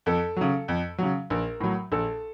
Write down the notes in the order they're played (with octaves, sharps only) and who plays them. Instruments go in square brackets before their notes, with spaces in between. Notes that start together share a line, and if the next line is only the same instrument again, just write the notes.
[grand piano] F2 A4
C#3 F#3
F2
C#3 F#3
A#1 A#4
A2 F#3
A#1 A4